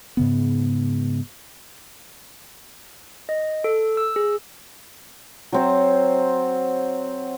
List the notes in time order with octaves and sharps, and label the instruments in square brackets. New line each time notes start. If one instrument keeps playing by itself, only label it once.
[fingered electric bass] G#2 C#3 B3
[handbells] D#5
A4
E6
G#4
[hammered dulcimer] F#3 C4 C5